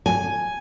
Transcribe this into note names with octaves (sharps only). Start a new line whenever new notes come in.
G#5